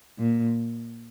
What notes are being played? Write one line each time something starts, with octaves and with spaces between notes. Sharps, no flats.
A#2